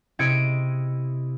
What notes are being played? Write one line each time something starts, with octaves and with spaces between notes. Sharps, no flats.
C3 E4 D#5 G#6 C#7 D7